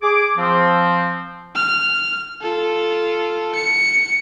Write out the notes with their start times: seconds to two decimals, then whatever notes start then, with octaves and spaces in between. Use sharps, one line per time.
0.03 G#4 D6
0.38 F3 C4
1.55 F6
2.41 F4 A4
3.55 C#7